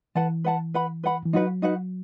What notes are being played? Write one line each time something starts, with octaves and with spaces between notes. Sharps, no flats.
E3 B4 F#5 A5
B4 F#5 A5
B4 F#5 B5
B4 F#5 B5
E3
F#3 D#4 F#4 B4 F#5
D#4 F#4 B4 F#5